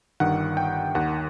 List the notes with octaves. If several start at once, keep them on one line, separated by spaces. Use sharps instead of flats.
G1 G2 D#3 F#5
G5
D#2 D#3 F#5